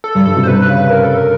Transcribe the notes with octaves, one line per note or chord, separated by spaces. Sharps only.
A4
G2
G2 A4
C3
C5
C3 B4
B4
C#3
B4
A#4
A4
A#4